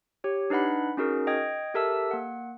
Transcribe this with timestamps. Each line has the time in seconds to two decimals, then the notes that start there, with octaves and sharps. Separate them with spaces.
0.24 G4 C#5
0.50 D4 D#4 B4 F#5 B5
0.97 C#4 D#4 F#4 G#4 A#4
1.27 D#5 G5 D#6 G#6
1.74 G4 A4 A#4 E5 A5 E6
2.11 A#3 F#5